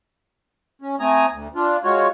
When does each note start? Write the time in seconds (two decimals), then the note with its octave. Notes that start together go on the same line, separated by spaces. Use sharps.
0.82 C#4
1.00 A3 C4 G#5 A#5 D#6
1.32 D2
1.55 D4 F4
1.84 G#3 F4 F#4 C#5